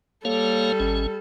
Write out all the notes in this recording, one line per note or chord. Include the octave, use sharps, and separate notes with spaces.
G3 A#3 A4 C#5 F5
G#1 C#4